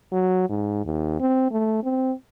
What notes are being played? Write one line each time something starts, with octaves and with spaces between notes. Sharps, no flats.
F#3
G#2
D#2
C4
A3
C4